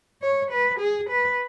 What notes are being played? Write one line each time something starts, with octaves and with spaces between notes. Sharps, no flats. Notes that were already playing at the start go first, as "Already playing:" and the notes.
C#5
B4
G#4
B4